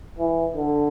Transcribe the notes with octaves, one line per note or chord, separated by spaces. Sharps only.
E3
D3